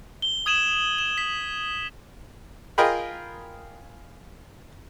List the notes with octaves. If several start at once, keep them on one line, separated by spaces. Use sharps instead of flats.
G7
D#6 G#6 D#7 E7 F#7
E7
B6
F4 G#4 A#4 D#5 G5 B5